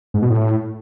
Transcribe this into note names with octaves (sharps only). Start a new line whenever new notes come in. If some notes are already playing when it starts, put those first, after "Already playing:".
G#2
B2
A2